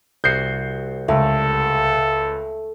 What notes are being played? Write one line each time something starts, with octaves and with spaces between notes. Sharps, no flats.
C2 F#4 G6 C7
C#2 A3 A4